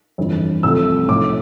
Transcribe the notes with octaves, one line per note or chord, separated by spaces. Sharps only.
G1 F2 E3
C2 C3 F3 A3 E6
B1 A2 F3 A3 D6